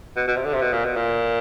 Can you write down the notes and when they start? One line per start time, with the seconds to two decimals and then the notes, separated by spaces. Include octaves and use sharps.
0.16 B2
0.28 B2
0.36 C3
0.45 D3
0.53 C3
0.62 B2
0.73 A#2
0.85 B2
0.97 A#2